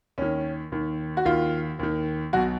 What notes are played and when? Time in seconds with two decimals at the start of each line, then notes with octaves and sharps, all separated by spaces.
0.18 D#2 D#3 C#4
0.72 D#2 D#3
1.17 F#4
1.25 D#2 D#3 F4
1.79 D#2 D#3
2.33 B1 F#4
2.36 B2